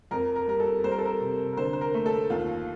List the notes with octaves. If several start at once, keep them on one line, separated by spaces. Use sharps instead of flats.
F2 A#4
A#4
G3 A#4
A4
G3 C5
A#4
A4
A#4
C3
A#4
D3 C5
C5
A#4
A3
A4
D#2 F4